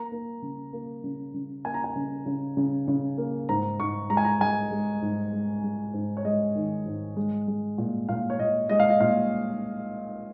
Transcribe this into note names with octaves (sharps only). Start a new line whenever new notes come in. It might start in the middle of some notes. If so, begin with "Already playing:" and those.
Already playing: A#3 A#5
A#3
C#3
A#3
C#3
C#3
A#3 G#5
A#5
G#5
C#3
C#3
C#3
C#3
A#3
G#2 A#5
G#2 C#6
G#3 A#5
G#5
A#5
G#3 G#5
G#3
G#2
G#3
G#3
G#2
C#5
G#3 D#5
D#3
G#2
G#3
G#3
A#2
A#2 F5
C#5
A#2 D#5
G#3 D#5
F5
D#5
A#2 F5